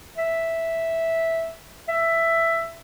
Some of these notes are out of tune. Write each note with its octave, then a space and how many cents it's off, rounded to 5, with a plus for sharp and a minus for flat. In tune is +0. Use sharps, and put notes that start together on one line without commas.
E5 -5
E5 +10